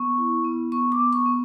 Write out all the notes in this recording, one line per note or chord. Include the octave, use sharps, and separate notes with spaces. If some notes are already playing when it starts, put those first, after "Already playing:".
Already playing: B3 C#6
E4
B3
B3 C#6
D6
B3
C#6
B3